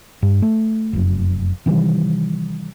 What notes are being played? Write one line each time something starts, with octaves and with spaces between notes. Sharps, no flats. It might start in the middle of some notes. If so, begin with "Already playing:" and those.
G2
A3
F1 F#2
C3 D#3 E3 G3